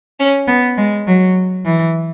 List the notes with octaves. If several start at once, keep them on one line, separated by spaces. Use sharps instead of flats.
C#4
B3
G#3
F#3
E3